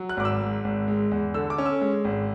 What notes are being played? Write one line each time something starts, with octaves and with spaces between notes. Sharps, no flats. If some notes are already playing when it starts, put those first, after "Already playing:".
Already playing: F#3
F#6
G#1 D6
E6
G#2
G#1
G#3
E2
D3 E6
D6
C#4
E6
G#3
G#1